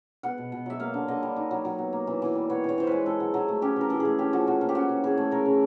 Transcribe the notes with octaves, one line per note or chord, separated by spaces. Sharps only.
B3 F#5
B2
B2
F#3 E5
A#3 F5
D3
D3 D#5
G3
D#4
F#3
F#3
B3
A#3
E3
E3
G3
B3 C#5
E3 C#5
E3 C5
G#3 B4
C4 A4
F#3
F#3
A3
C#4 G4
E3 A#4
E3 A4
A3 G#4
C#4 G4
F3 F#4
F4 F#4
A#3 F4
G4
C#4 F#4
E3
E3 G#4
A3
A3 A#4
C#3